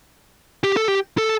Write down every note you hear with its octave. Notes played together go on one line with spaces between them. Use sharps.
G4
A4
G4
A4